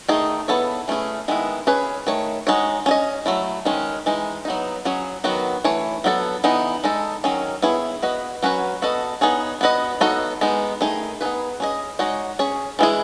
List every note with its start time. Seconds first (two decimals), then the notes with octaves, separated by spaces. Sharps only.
0.08 D#3 A3 D#4 G#4
0.48 B3 E4 A4 C#5
0.88 E3 A3 C#4 G#4
1.28 D#3 G#3 B3 E4
1.67 C#4 G#4 B4
2.07 D#3 A3 C#5
2.47 G#3 D#4 F#4 C#5
2.86 C#4 G#4 D#5
3.26 F#3 A3 E4
3.65 D#3 G#3 C#4
4.06 E3 G#3 D#4
4.45 F#3 B3 D#4
4.85 F#3 C#4 G#4 C#5
5.24 D#3 F#3 B3 F#4
5.64 E3 A3 C#5
6.04 F#3 B3 E4 A4
6.44 E3 B3 D#4
6.84 G#3 D#4 A4
7.24 D#3 F#3 C#4 G#4
7.62 B3 E4 G#4 C#5
8.02 B3 F#4 B4 D#5
8.43 F#3 C#4 F#4 B4
8.82 B3 F#4 A4 D#5
9.21 B3 D#4 G#4 C#5
9.61 B3 F#4 B4 D#5
10.01 B3 D#4 F#4 A4 C#5
10.41 G#3 B3 D#4
10.81 D#3 A3 D#4 G#4
11.21 B3 D#4 G#4 B4
11.60 C#4 G#4 D#5
11.99 G#3 D#4 F#4 C#5
12.39 C#4 G#4 C#5
12.79 E3 G#3 B3 E4 G#4